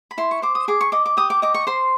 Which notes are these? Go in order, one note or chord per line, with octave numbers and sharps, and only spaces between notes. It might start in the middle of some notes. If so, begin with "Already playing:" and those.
B5
E4 C6
C#6
C5 D6
D#6
G#4 D6
C#6
D#5 D6
D6
G4 D#6
D6
D#5 D6
C#6
C5 C6